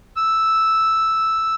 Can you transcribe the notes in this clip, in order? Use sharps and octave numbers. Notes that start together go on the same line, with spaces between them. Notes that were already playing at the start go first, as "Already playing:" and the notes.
E6